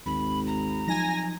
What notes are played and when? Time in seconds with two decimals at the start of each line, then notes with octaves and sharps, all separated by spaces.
0.06 G#1 D#2 B5
0.47 A#5
0.87 F3 F#3 D#4 G#5 A#6